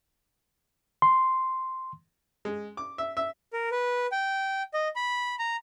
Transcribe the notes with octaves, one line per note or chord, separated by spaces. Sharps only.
C6
G#3
D6
E5
E5
A#4
B4
G5
D#5
B5
A#5